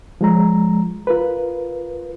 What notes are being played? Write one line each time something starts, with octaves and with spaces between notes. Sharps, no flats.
F3 G#3 A#5
F4 A#4 B4